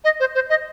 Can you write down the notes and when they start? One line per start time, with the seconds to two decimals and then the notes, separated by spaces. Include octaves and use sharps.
0.04 D#5
0.20 C5
0.35 C5
0.50 D#5